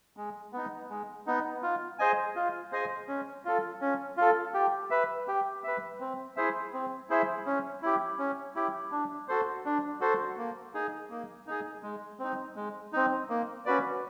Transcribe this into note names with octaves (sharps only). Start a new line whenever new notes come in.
G#3
B3 D#4
G#3
B3 D#4
F4
G#4 C5 D#5 G#5
F4
G#4 C5 D#5 G#5
C#4
F4 A4
C#4
F4 A4
G4
B4 E5
G4
B4 E5
C4
E4 G#4 C5 E5
C4
E4 G#4 C5 E5
C#4
E4 G4
C#4
E4 G4
D4
F#4 A4 C5
D4
F#4 A4 C5
A#3
D#4 G#4
A#3
D#4 G#4
G#3
C4 D#4
G#3
C4 D#4
A#3
C#4 F#4 B4 D5